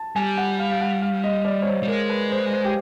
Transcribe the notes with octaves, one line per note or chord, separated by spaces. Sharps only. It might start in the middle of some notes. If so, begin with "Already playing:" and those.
Already playing: A5
G3 G#5
F#5
F5
F5
F#5
F5
D#5
D5
C#5
C5
G3
G#3 A#4
B4
C5
C5
G4